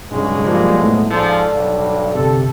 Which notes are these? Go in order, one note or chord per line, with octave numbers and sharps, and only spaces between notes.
B1 G2 C#3 G#3
F3 G3 A#3
A2 A3 B3
G#2 F3 A4 D5
B1 G2
G1 C3 A4